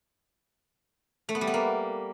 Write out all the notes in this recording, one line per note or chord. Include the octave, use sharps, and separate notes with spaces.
A3
B3
G3
B3
A#3